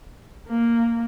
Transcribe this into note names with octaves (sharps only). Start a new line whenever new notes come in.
A#3